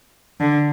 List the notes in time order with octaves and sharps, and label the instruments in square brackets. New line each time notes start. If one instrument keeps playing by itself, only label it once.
[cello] D3